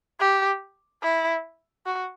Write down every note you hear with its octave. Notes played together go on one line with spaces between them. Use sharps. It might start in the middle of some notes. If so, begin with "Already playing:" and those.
G4
E4
F#4